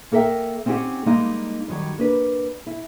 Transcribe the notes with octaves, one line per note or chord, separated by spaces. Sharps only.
A#3 A4 A#4 E5 G5
C4 C#4 D#4 F#4 G4 F#5
G3 G#3 A#3 D#4
F#2 D#3 F#3 G3
A#3 D4 B4
E4